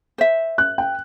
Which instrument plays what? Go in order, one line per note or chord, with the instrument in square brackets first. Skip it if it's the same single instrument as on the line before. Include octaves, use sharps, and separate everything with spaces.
[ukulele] C5 E5
[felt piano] F#6
G5